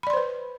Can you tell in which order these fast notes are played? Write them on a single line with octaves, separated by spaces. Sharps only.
B5 D5 C6 C5 B4